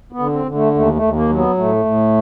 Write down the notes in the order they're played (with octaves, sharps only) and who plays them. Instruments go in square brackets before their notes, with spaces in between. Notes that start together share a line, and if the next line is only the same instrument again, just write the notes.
[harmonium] B3
D3
C4
D3
A3
D#2 A3
A3
D#2
A#3
F#3
B3
A2 A3
A2